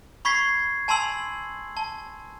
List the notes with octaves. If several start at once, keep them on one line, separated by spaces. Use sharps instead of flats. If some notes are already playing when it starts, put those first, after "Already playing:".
B5 C#6 G#6 B6 C7
G#5 A5 B5 C6 E6 F#7
A5